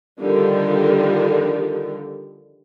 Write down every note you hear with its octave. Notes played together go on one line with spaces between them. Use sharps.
D3 D#3 F3 G3